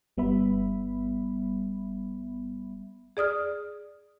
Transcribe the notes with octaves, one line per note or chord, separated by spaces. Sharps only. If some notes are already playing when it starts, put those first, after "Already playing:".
G1 G3 B3 E5 B5
G#4 D5 D#6 F6